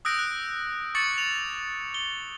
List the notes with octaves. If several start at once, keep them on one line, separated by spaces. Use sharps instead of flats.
D#6 E6 F#6 G6 A#6 D7
F#6
C#6 D6 A6 C#7 F#7
F7 F#7
G7